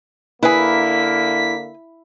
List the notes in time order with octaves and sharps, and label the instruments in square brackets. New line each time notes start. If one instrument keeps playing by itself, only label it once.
[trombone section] D3 A#3 [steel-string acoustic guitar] E4 [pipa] G#4 B4 [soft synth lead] B6